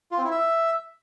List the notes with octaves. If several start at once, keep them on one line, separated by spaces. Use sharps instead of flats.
F4
C4
E4
E5